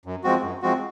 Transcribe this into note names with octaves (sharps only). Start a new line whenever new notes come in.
F#2
F3 G#3 C4 F#4
F#2
F3 G#3 C4 F#4